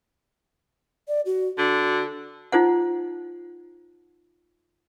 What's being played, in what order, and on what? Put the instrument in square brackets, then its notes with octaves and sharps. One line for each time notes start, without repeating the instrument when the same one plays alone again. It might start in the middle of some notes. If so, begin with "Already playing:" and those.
[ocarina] D5
F#4
[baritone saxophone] D3 [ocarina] F#4
[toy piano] D#4 F4 C5 F#5